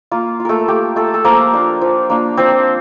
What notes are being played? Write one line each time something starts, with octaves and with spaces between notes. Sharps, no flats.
A#3 F4
F4
A3 A4 A#4
A#3 G4
A3 F4 A4
A4
F3 A#3 A#4
A#3 D4 F4
F3
A#3 D4 F4
F3 C4 C5